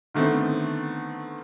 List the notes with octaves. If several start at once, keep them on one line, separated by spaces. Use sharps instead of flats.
D3 D#3 A3 B3 C4